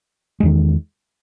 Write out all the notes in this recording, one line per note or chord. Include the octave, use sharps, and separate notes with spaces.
E2 D#3 G#3